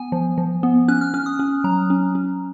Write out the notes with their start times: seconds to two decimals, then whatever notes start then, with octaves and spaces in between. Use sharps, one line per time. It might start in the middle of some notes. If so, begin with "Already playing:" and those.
Already playing: B3 G#5
0.12 F3
0.38 F3
0.63 B3
0.88 C#4 F#6
1.01 F6
1.14 C#4 F6
1.26 D#6
1.39 C#4
1.64 F#3 A#5
1.90 C#4
2.15 C#4